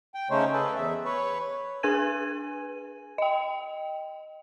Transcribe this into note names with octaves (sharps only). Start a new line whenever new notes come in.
G5
C#3 A3 C#4 D#4 C5 C#5
G#4 A4 B4
E2 E5
B4 C#5
D4 G#4 B4 G#5 G#6 D#7
D#5 G5